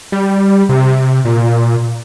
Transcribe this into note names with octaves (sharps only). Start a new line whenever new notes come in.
G3
C3
A#2